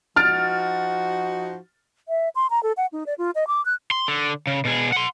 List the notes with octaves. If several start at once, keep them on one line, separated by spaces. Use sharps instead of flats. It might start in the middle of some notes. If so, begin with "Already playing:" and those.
F3 D#4 F#4 F6 A6 D7
E5
C6
A#5
A4
F#5
D#4
D5
F4
D#5
D6
F#6
C6
D3
C#3
B2 G#4
F#5 C6